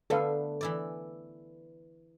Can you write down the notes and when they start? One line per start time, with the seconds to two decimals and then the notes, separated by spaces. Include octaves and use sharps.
0.10 D3 A3 B3 A4 B4 F5
0.61 E3 E4 D5